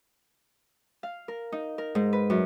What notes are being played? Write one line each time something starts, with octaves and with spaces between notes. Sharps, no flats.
F5
A#4
D#4
A#4
G#2
B4
F#2